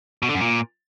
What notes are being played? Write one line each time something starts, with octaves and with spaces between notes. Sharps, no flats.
B2
D3
F#2
A#2